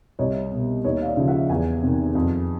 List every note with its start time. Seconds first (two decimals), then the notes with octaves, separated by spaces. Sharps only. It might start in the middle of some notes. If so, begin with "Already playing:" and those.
0.19 C2 C#5 D#5
0.52 B2
0.84 D#2 C#5 D#5
1.02 F5
1.06 D5 E5
1.17 C#3 F3
1.28 E5 F#5
1.50 E2 F#5 G#5
1.83 C3 D#3
2.15 F2